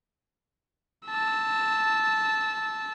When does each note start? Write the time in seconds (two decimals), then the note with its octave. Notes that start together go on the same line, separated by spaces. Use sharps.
1.08 A5 E6